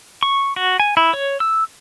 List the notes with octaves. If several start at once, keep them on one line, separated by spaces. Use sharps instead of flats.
C#6
F#4
G#5
E4
C#5
E6